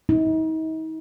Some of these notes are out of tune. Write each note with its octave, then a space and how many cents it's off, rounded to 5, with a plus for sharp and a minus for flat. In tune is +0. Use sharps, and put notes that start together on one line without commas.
D#4 +40